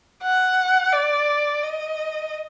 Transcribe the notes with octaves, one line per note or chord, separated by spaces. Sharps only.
F#5
D5
D#5